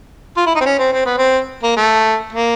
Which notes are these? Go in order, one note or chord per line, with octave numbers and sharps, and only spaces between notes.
F4
E4
D#4
C4
C#4
C4
C4
B3
C4
A#3
A3
A#3